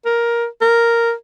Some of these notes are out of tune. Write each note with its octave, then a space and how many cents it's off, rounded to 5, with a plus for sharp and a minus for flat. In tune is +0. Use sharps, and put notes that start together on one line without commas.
A#4 +10
A#4 -5